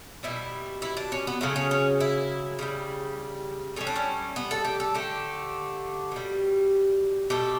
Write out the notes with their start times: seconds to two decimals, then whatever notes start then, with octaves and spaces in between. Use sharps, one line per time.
0.23 B2 G3 E4
0.82 E4
0.97 D4
1.12 C#4
1.27 B3
1.41 C#3 F#3 A3
1.56 C#4
1.71 C#4
2.00 E4
2.59 C#3 E3 G3
3.76 A2 G3 C#4
3.87 D4
3.96 C#4
4.36 B3
4.51 A4
4.65 G4
4.80 A4
4.94 D3 A3 G4
6.12 B2 G3
7.30 B2 A3 G4